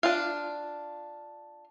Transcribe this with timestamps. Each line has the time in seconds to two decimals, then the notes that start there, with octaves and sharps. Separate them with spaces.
0.03 D4 F4 F5